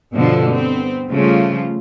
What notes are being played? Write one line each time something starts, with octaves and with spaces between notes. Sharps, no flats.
G2 B2 D3 F3 D4
B3 C4
C#3 F3 G3 A3 F4